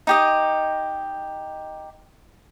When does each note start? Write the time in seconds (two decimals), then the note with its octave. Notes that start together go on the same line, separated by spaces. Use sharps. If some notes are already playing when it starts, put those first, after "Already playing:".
0.07 D#4 G4 D#5